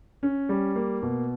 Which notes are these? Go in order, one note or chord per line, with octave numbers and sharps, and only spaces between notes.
C#4
G3
A#3
B2